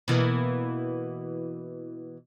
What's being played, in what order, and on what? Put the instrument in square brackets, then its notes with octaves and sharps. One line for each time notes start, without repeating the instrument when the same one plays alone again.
[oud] B2 E3 A#3